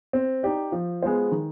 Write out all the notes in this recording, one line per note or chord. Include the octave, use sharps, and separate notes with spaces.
C4
D#4 G4 D5
F3
G#3 B3 F4 C5
D#3